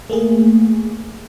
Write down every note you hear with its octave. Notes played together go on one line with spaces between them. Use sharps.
A3 A#3 G#4